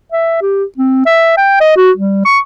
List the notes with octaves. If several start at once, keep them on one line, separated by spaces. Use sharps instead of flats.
E5
G4
C4
E5
G5
D#5
F#4
G3
C#6